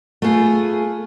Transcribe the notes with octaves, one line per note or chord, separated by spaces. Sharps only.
A3 B3 F4 G#4